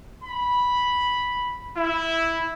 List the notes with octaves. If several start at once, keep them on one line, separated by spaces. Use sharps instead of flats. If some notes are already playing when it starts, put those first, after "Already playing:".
B5
E4